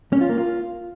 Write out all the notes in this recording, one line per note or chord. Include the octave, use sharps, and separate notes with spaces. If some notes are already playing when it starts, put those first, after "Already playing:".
C#4
F4
A#3
F4